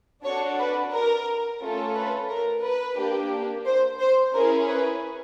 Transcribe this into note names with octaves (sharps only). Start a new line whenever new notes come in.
D4 F#4 A4 C#5
B4
A#4
A3 C#4 F4 A4
B4
A#4
B4
A#3 D4 G4
C5
C5
C#4 E4 G#4 A#4
B4